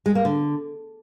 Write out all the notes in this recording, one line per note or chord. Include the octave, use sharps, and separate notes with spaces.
G#3
A#3
D3